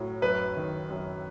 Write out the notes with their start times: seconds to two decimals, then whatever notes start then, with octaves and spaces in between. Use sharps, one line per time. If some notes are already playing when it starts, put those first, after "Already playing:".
Already playing: A2 F#3
0.22 F#2 B4
0.56 D#3
0.90 F#2